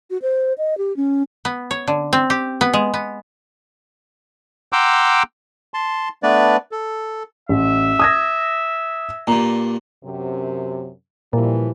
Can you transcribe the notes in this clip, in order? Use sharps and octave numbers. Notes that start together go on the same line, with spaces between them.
F#4
C5
D#5
G4
C#4
B3
C#5
D3
C4
G4
B3
G#3
B3
F#5 G5 A#5 C6 D6 E6
A5 C6
A3 B3 D4 B4 D5
A4
A1 E5
D#6 G#6 A#6
G2 A#2 A#5
F#2 C3
A#2 E3 F3 G3